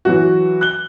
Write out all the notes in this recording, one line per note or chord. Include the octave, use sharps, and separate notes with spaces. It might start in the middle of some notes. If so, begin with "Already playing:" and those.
E3 F#3 F#4
F#6 G7